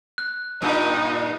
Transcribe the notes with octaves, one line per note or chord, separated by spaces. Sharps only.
F#6
G2 A#2 D#4